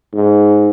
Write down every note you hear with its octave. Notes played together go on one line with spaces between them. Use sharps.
G#2